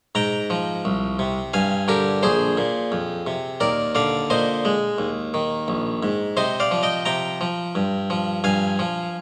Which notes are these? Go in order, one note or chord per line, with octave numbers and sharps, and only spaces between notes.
G#2 G5 A#5
F3
C2
C3
G2 F5 G#5
D3 G4 A#4
A#1 G#4 C5
A#2
F2
C3
D#2 A#4 D5
D3 D5 F5
A#2 C5 D#5
G#3
D#2
D#3
A#1
G#2
C3 C5 D#5
D5 F5
F3
D#5 G5
C3 G5 A#5
F3
G2
F3
G2 F5 G#5
F3